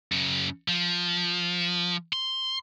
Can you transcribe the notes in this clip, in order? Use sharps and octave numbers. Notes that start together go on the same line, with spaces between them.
F#2 C#3
F3
C6